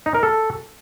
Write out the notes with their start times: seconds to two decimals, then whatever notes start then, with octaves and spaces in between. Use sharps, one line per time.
0.06 D#4
0.14 A#4
0.23 A4